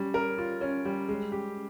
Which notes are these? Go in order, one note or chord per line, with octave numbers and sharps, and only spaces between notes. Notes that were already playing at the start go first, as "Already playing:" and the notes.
Already playing: G3 C#4
A#4
F4
C#4
G3
G#3
G4